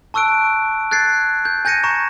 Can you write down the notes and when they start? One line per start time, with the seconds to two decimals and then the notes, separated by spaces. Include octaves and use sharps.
0.14 A5 C#6 E6 F#6 D7
0.91 F#6 G#6 A6 C7
1.45 G6
1.65 G#5 G6 G#6 A#6 C#7 D#7
1.84 A#5 C#6 E7